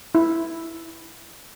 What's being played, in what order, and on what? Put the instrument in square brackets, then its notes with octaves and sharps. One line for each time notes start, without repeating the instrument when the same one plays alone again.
[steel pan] E4